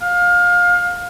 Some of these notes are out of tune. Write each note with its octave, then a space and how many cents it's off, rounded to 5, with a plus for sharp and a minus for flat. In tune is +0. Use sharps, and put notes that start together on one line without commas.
F5 +25